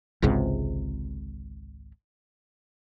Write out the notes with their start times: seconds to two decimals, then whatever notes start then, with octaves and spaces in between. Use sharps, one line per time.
0.22 G#1 C#2 G#2 C3